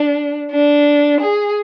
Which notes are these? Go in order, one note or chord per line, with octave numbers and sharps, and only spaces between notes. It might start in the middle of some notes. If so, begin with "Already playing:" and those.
Already playing: D4
D4
G#4